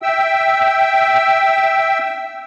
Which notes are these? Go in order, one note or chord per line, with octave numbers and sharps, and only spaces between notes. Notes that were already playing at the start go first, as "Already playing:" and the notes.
E5 G5 E6